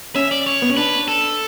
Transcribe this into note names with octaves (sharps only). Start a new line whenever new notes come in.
C#4 E5
D5
C#5
B3
C#4
D4 B4
A4